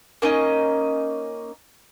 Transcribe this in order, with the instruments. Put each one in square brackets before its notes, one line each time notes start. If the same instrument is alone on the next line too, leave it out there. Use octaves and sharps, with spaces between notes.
[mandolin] A#3 C#4 D#4 D#5